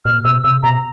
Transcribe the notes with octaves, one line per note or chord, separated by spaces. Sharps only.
A#2 F6
B2 E6
C3 E6
B2 A#5